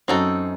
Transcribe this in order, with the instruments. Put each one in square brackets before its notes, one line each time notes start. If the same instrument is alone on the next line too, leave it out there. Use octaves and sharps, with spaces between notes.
[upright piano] F#2 [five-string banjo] C4 D#4 F#4 A4